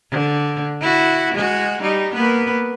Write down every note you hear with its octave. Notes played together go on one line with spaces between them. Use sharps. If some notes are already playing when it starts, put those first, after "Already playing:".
D3
E4 F#4
G#3 F#4
G3 D#4
A#3 B3 B4